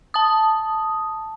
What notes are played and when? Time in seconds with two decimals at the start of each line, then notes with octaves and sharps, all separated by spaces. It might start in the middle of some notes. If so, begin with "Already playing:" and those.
0.14 A5 D#6